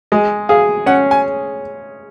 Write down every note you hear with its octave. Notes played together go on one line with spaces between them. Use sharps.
G#3 D#5
G#4 F5
C#4 F#5
G#5